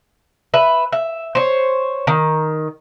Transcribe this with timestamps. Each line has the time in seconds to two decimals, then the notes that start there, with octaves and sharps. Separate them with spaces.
0.54 B4 E5
0.92 E5
1.35 C5 C#5
2.07 D#3